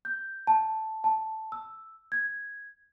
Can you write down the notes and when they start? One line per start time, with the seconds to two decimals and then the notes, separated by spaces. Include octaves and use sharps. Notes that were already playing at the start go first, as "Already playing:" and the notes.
0.05 G6
0.47 A5
1.04 A5
1.52 E6
2.12 G#6